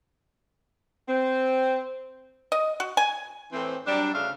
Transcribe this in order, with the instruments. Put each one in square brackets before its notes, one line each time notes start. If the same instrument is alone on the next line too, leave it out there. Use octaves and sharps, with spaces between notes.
[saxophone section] C4
[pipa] D#5
F#4
G#5
[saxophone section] A2 E3 C4
F#3 G3 D4
D2 C#3 D4 E5 F5